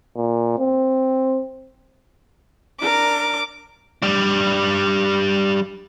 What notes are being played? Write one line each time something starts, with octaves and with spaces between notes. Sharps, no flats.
A#2
C4
D4 A#4 D6
G3 D4